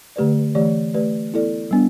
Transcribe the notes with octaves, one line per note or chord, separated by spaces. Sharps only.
D3 A3 G4 B4 D5
E3 A3 G4 D5
A3 G4 B4 D5
B3 E4 A4 D5
G3 B3 D4